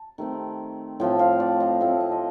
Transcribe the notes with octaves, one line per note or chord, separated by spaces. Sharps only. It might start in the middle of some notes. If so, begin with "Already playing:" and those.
Already playing: A5
D#3 A3 C4
A2 F3 A3 C4 G5
F5
D5
D#5
A2 F3 A3 C4 F5
D#5
D#5